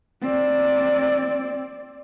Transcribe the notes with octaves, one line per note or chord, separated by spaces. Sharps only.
C4 D5